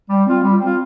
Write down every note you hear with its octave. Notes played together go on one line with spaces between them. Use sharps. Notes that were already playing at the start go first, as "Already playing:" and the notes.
G3
C4 F4
G3
C4 F4